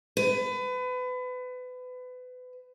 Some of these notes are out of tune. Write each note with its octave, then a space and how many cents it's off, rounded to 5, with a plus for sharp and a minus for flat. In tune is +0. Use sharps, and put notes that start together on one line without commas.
B4 +30